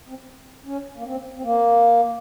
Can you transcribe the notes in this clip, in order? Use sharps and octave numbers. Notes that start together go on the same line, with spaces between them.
C4
C#4
A#3
C4
C4
A#3